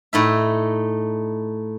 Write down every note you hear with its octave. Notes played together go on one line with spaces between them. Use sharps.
A2 D#4 E5